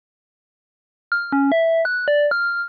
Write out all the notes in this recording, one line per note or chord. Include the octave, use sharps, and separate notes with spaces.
F6
C#4
E5
F#6
D5
F6